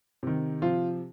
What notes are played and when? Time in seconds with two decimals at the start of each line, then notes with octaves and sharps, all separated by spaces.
0.23 C3 D#3
0.62 C3 F3 F4